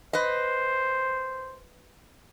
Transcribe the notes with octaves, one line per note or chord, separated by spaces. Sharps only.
B4 C5 D#5